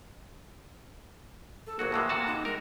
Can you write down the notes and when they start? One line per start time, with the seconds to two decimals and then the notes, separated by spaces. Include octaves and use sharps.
1.67 A4
1.79 G#1 F#3 A#3 F#4
1.92 A2 E3 G#3 A#3
2.09 C3 F#4 A5
2.27 D#4
2.45 G#3 A#4